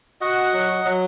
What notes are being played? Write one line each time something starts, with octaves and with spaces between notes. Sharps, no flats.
F#4 D#5 F#5
F#3
F#3